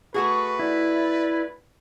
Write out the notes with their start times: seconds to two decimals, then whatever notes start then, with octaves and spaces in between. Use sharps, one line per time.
0.14 A3 F#4 G#4 B4 C#6
0.59 E4 D5